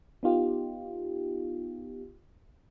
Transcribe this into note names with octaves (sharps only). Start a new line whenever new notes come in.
B3 D#4 F4 G4